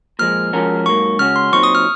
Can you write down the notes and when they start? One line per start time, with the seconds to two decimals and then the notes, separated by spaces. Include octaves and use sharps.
0.19 A#2 F3 G#3 F6
0.53 F3 G#3 C#4 F#4 A#4
0.86 G#2 F#3 A#3 C#6
1.19 C#3 G#3 C#4 F#4 F6
1.36 C6
1.52 A#2 F#3 C4 D#4 C#6
1.63 D#6
1.75 F6